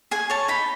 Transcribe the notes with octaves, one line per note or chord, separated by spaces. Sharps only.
G#4 G#5
C#5 A5
D#4 B5